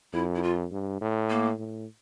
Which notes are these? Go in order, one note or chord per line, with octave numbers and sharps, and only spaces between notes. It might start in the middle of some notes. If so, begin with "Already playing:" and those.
F2 E4
E4
F4
G2
A2
A#3
A2